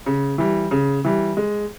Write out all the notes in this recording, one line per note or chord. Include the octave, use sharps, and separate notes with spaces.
C#3
E3 G3
C#3
E3 G3
G#3